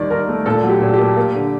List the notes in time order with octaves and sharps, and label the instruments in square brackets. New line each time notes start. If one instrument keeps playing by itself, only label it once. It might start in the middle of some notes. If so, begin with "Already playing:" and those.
Already playing: [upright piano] D#2 D#3 G3 D5
D#2 A#4
A3
A#2 A4
F#3
G4
A#2
G4
A#3
A#3
D3